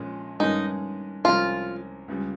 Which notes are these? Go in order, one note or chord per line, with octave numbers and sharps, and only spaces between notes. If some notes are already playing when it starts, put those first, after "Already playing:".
Already playing: A#1 A#2 G#3 C#4
G2 D#3 G#3 C#4 D#4
C2 C3 F3 G#3 C#4 F4
C#2 C#3 G3